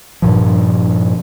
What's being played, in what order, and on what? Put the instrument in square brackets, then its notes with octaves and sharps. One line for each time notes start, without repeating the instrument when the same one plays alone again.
[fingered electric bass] G2 A#2 F3